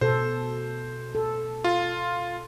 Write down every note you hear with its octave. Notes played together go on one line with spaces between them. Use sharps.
B2 A4 C5
A4
F4